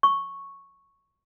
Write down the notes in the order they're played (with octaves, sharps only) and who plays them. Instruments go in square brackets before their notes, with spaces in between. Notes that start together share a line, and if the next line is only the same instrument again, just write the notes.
[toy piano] C#6